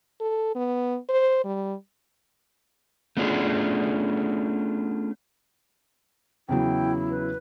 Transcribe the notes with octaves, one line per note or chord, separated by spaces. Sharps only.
A4
B3
C5
G3
A3 B3 C#4 D4 F4 G#4
E2 C#3 F#3 E4 G5
B4